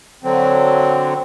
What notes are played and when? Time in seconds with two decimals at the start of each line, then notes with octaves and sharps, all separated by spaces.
0.23 D3 F#3 C4